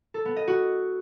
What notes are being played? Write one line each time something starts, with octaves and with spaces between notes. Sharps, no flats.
A4
B3
D#5
F#4